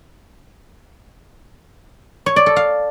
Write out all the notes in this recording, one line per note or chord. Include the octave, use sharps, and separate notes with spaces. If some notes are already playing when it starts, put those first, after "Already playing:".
C#5
D5
A4
F5